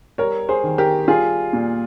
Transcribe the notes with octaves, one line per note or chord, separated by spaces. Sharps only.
G3 A#4 C#5
G#4 C5
D#3
G4 A#4
G3 F4 G#4
A#2